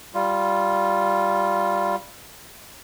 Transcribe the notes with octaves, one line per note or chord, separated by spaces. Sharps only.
G3 F4